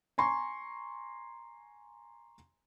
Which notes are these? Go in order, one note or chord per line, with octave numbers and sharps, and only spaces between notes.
G#5 A#5 C6 C#6